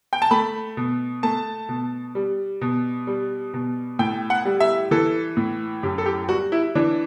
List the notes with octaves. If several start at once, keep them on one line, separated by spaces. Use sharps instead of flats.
G5
A5
A3 B5
B2
A3 A5
B2
G3
B2
G3
B2
A2 G5
F#5
G3
E5
E3 A4
A2
F#2 G4
A4
G4
G3 F#4
E4
E3 D4